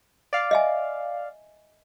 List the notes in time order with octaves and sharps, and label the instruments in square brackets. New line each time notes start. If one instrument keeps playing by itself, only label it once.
[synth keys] D5 F5
[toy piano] D#5 E5 G#5